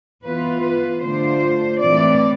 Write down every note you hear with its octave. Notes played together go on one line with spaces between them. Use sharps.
E3 B3 F4 B4
B4
D3 A3 D4 F4 C5
A2 E3 A3 C4 D5